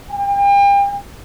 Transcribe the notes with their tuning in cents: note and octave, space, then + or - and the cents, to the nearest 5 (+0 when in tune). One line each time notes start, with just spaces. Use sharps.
G5 +40